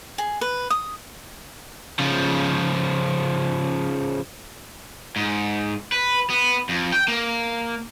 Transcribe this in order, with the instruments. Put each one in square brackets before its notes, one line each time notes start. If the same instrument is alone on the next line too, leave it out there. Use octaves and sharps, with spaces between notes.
[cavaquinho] G#4
B4
D#6
[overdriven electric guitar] C#3 F3
G#2
B4
B3
F2
G5
A#3